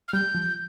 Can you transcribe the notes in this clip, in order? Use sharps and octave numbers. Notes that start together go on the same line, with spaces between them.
F6
G3 G6
F3